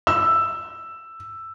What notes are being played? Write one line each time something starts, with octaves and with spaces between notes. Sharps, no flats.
E6